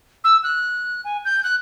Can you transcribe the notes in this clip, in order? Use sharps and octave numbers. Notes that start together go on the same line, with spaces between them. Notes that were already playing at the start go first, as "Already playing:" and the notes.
E6
F#6
G#5
G6
F#6